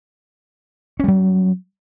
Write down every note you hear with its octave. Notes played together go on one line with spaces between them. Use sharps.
F#3 G3 C#4